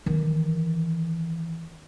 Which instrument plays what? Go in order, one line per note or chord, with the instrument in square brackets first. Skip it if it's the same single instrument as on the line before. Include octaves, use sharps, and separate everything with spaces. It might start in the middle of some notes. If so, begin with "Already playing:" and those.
[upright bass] D#3 E3